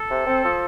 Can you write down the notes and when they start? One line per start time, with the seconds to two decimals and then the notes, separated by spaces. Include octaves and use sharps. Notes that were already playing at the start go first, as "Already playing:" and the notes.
Already playing: A4
0.09 C3
0.26 C4
0.43 F3